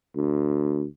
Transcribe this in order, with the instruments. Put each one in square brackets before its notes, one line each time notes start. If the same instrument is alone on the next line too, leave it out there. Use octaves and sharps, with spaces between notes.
[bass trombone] D2